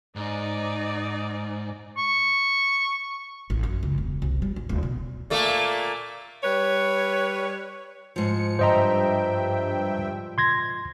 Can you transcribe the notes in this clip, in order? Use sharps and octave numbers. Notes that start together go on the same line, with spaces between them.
G#2 D#4 D5
C#6
A1
F#2
C#2
E1
C2
G3
G2
D1
B2
A#2 A3 A#3
G3 B4 C#5
G#2 F3 C#7
G2 C5 D#5 E5 G5 A#5
C6 G#6 A#6